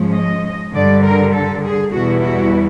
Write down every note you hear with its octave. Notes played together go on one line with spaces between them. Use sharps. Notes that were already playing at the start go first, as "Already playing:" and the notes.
Already playing: G#2 F3 G#3 C#4
D#5
G2 D3 G3 D5
A#4
A4
G#4
E2 B2 G3 B3 E4 F#4
F#4